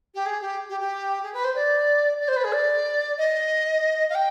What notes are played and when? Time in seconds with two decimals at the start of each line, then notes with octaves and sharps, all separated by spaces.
0.15 G4
0.26 G#4
0.42 G4
0.69 G4
0.80 G4
1.23 G#4
1.34 B4
1.44 C5
1.55 D5
2.21 D5
2.28 C5
2.36 B4
2.44 G#4
2.53 D5
3.18 D#5
4.10 F5
4.15 G5